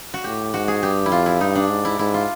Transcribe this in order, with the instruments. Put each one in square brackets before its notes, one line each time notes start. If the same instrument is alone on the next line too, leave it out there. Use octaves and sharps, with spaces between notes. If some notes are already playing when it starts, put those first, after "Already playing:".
[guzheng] F#4
[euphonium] A2 [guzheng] G4
[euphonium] G#2 [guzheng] F#4
[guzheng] G#4
[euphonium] G2 [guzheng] G4
[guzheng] E4
[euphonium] F2 [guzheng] F4
[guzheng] E4
[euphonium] G2 [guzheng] D#4
[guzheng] D4
[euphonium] G#2
[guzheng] E4
[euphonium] G#2 [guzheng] E4
[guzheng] F4